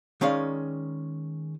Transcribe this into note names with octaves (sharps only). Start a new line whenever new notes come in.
D#3 G#3 C#4 D5 F5